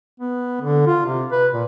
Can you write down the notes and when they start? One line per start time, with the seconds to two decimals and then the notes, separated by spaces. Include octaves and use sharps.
0.20 B3
0.61 D3
0.86 F4
1.06 C3
1.31 B4
1.53 A#2